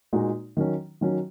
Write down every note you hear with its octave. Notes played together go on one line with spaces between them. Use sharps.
A#2 G#3 D#4 F#4
D#3 F#3 C#4
D#3 F#3 C#4